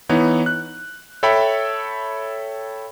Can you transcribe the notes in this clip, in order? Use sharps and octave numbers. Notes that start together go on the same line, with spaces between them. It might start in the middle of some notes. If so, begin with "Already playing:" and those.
E3 B3 D#4 C#5
F#6
A4 C#5 E5 G5 B5